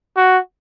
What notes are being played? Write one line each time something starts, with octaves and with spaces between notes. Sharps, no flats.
F#4